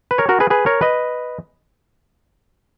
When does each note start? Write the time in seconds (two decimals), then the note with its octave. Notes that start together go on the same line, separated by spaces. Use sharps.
0.11 B4
0.18 A#4 C#5
0.29 F#4 A#4
0.40 G#4 B4
0.50 G#4 B4
0.66 A#4 C#5
0.81 B4 D#5